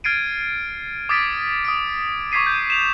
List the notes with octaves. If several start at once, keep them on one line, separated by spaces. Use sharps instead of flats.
F6 G#6 A6 C7 D7 D#7
D6 D#6 G#6 A6 B6 D7
D#6 F6 D7
C#6 D6 G#6 B6 C7 D#7
G6
E7 F7